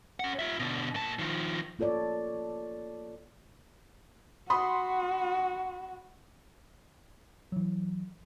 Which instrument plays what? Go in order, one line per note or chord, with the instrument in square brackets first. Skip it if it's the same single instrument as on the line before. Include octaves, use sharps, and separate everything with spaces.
[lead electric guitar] C#4 F#5
F4 E5
B2 D3
A#2 A5
D#3 F3
[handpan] A#3 F4 A4 C#5 D5
[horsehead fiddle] F#4 [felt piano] B5 C6 D#6
[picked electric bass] E3 F#3